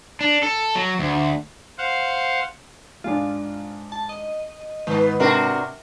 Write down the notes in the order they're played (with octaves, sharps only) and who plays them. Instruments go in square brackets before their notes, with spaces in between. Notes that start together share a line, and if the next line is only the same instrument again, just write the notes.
[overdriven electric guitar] D4
A4
F#3
D2
[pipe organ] C5 F5 F#5
[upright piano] G#2 G#3 D4 [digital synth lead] F4
[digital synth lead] A5
D#5
[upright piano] G#2 [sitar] D#3 B3
[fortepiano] C3 A#4 [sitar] D4 F#4